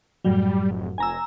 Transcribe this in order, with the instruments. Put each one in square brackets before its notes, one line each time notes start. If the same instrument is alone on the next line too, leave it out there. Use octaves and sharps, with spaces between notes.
[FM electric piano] F#2 A2 F#3 [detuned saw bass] G3
[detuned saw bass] F1
[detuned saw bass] F1 [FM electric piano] G#5 A#5 E6